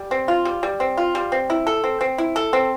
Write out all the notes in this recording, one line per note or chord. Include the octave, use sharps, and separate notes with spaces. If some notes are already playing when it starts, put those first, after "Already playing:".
Already playing: G3
C4
F4
G3
G3
C4
F4
G3
C4
E4
A4
C4
C4
E4
A4
C4